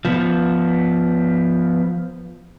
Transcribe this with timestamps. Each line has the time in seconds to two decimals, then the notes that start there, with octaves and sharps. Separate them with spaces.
0.05 F3 B3